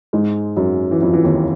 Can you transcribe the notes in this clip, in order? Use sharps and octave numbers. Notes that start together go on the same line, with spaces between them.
G#2 G#3
F#2 F#3
E3
F2 F3
E3
D#2 D#3